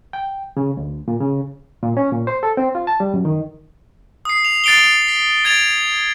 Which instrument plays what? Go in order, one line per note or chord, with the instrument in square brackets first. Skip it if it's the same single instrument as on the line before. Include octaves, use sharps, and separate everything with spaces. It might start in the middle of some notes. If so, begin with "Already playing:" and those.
[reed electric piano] G5
C#3
D2
A#2
C#3
A#2
C#4
A#2
C5
A4
C4
F4
A5
G3
F#2
D#3
[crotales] D#6 C7
F7
A6 C7 D7 F7 G7
B6
G#6 A6 D7 F7